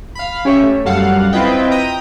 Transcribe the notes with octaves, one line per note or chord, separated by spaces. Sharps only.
F5 B5
C#4 G4 C#5 E5
A3
F#2 G3 A4 F5 F#5
C4 E4 F4 B4 D#5 G5
G5 A#5 D#6